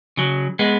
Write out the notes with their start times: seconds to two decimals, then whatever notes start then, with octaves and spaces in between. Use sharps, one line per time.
0.17 C#3 F#3
0.59 G#3 B3